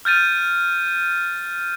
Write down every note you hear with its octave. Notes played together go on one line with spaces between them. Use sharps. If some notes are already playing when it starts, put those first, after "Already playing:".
F6 G6 A6 D#7